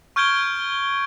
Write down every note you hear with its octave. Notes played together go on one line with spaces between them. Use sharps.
C#6 F6 G6 G#6 D7 G7